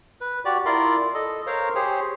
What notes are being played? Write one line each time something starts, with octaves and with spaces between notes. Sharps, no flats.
B4
F#4 G4 D5
E4 F4 A#4 D5 C6
A4 D#5
A#4 C5 C#5 F5 A#5
G4 G#4 C5 C#5